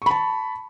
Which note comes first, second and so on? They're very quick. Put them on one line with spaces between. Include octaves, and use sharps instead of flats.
C#6 B5 A5